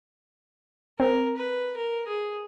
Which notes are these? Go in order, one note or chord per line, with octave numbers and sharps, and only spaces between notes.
C4 A#4
B4
A#4
G#4